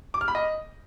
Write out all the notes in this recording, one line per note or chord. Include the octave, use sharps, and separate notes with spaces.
D6
F6
B5
D#5